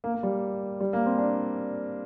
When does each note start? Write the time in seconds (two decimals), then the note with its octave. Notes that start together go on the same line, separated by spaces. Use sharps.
0.04 A#3
0.14 A#3
0.23 G3
0.80 G3
0.93 A#3
1.06 C4
1.18 D4